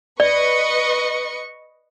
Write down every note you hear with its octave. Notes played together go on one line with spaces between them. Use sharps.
B4 D5 D#5 C#6